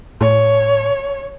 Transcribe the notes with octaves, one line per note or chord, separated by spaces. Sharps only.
A2 C#5